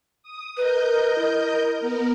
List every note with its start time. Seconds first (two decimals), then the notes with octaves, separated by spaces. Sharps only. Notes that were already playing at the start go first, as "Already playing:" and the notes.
0.23 D#6
0.57 A#4 B4 D#5 G6
1.18 E4
1.77 B3 A#4